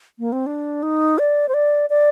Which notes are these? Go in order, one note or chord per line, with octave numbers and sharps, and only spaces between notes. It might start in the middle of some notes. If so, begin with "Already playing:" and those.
A#3
C4
D4
D#4
D5
C5
D5
D5